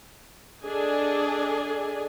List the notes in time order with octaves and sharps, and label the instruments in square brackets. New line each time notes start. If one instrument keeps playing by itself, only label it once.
[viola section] D4 G#4 A4 D#5 G#5